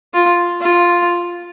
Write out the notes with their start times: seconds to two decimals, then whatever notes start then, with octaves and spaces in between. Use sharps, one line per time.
0.14 F4
0.61 F4